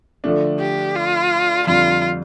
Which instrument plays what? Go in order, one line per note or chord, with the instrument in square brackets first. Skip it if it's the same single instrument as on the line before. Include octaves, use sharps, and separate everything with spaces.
[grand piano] D3 F3 A3 D4
[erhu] G4
F4
[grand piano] F2 D3 G3 [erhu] F4